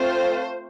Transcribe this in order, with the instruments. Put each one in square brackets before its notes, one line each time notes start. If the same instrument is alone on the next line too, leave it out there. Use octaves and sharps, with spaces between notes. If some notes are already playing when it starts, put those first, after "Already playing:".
Already playing: [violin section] A3 C4 F4 C5